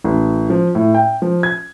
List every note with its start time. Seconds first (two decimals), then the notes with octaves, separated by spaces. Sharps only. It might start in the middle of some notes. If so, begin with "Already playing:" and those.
0.04 A1
0.50 F3
0.75 A2
0.94 G5
1.22 F3
1.43 G#6